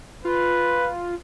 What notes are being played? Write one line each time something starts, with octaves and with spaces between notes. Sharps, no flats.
F4 B4